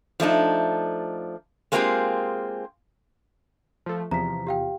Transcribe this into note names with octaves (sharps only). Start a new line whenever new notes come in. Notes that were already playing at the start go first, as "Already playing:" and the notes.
F3 A3 D4 D#4
G#3 A#3 C4 F4 G4 G#4
F3 A3
E2 C3 F3 A#5 B6
G4 F5 G5